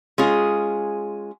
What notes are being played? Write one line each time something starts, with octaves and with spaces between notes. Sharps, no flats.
G#3 C#4 F4 G#4